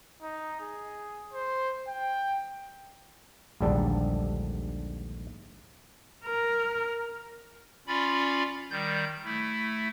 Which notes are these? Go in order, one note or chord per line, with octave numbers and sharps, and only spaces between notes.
D#4
G#4
C5
G5
A#1 D#2 G#2 D3 G3 A4
A#4
C#4 F4 D5 B5
D#3 G3 G6
A3 E4